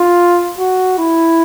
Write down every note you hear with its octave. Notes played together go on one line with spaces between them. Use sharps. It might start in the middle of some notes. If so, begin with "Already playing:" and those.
Already playing: F4
F#4
E4